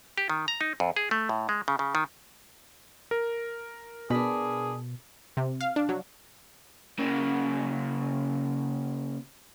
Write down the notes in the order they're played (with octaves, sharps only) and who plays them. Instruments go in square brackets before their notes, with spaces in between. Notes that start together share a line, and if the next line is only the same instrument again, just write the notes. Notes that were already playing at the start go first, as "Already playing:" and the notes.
[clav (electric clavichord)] G4
D#3
A#5
D#4
F2
G#4
A3
A2
G#3
C#3
C#3
D#3
[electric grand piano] A#4
[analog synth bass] B2 [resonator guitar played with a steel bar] D4 B4 [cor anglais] G#4
[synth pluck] C3
F5
D4
F#3
[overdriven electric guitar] C#3 A#3